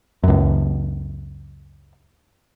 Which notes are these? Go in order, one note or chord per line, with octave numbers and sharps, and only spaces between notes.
C#2 F#2